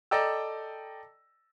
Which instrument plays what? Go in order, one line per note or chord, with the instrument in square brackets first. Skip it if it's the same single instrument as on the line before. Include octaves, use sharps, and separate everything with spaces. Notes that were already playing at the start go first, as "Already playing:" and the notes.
[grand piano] A4 D5 D#5 G5 A#5 E6